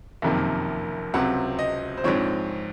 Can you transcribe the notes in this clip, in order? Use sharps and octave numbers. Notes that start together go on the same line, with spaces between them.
F#1 F2 C3 D#3 A#3
C#2 C3 F#3 C4 F#5
D#5
C5
A#1 G#2 F3 C4 C#5